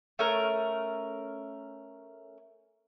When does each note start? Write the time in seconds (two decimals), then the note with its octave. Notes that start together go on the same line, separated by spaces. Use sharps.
0.19 A3 C#4 A#4